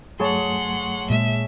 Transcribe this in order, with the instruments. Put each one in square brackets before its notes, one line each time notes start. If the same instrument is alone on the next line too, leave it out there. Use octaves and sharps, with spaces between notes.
[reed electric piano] G2 F#3 A3 [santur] G#4 C#5 A5 [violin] F#5 C6
[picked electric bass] A#2 G#3 [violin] E5